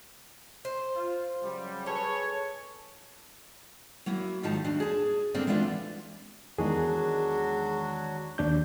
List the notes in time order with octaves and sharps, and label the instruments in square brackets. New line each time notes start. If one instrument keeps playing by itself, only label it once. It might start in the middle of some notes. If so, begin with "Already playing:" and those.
[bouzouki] C5
[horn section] F4
C#3 F#3 G3
[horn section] G#4 B4 C#5 [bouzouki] A4
[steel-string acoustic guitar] F#3 A#3 E4
G#2 D#3 F3 D#4 A5
D#2 D4
G#4 A5
G2 D3 A#3 C4 D4
E3 G#3 B3 D4 D#4 F4
[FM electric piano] E2 D#3 G#3 [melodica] F#3 D4 F#4 [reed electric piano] G#4
[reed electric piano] D#2 D4 G6